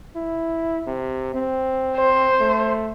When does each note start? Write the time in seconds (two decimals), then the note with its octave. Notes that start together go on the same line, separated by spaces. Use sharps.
0.16 E4
0.87 C3
1.34 C4
1.96 C5
2.41 A3